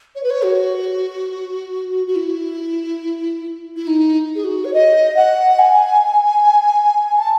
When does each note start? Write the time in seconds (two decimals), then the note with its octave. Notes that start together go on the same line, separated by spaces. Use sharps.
0.15 C#5
0.23 B4
0.30 C#5
0.44 F#4
2.07 F#4
2.16 E4
3.76 E4
3.87 D#4
4.36 G#4
4.44 F#4
4.65 C#5
4.74 D#5
5.16 F#5
5.59 G#5
7.18 A5